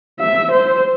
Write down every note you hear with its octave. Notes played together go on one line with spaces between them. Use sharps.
E5
C5